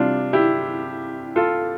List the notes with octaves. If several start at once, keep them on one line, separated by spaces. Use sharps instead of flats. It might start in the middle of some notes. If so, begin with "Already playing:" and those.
Already playing: C3 E3 G3 D4 F4
E4 G4
F4 A4